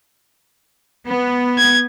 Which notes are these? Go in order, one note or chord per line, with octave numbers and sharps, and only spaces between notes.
B3
G#6